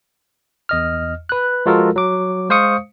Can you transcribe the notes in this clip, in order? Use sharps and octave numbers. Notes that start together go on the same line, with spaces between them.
E2 D#5 F6
B4 F#6
F3 G#3 F4 F#4 A4 A#4
F#3 D6
G#3 C5 F5 C#6 D#6 C#7